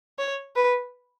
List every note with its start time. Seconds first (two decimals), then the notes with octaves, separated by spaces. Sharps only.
0.19 C#5
0.56 B4